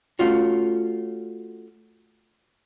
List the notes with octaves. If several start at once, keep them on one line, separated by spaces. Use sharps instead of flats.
A3 C#4 F4 F#4